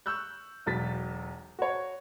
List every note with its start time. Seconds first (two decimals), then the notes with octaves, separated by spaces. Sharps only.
0.06 C#6 E6 F#6 G6
0.66 E1 B1 A6 B6
1.59 F#4 C#5